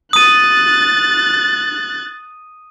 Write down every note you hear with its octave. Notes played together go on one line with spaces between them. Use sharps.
D#6 F#6 A6 D#7